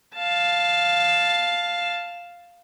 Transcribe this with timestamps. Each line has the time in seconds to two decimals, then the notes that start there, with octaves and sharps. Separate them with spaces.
0.15 F5 A5